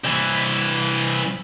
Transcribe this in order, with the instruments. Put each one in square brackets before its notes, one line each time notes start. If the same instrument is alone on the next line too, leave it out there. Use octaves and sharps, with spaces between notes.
[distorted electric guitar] C2 E3